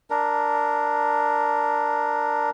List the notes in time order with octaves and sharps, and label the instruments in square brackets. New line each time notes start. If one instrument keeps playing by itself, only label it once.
[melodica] D4 A#4